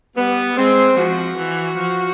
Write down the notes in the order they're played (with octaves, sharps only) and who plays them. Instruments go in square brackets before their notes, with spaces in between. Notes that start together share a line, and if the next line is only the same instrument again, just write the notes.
[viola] G3 [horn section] B3
[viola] G#3 [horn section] C4
[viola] F3 [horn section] F#4
[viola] E3
F3